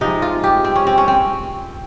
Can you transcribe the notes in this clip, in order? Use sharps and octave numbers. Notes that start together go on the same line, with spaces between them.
C3 F3 G#3 D#4
F4
G4
C4
C#4
C4
C#4
C4